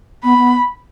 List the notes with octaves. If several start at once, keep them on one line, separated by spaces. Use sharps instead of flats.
B3 B5
B3